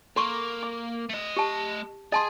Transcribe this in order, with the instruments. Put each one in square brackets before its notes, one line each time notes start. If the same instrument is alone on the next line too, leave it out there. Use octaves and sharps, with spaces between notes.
[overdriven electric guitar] A#3 [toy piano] A4 C6 C#6
[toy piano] D6
[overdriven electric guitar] A3 D#5
[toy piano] G4 A5
[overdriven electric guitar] G#4 [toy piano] D#5 A5 C6